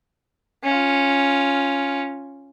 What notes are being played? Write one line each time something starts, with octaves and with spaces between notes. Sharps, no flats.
C#4 F4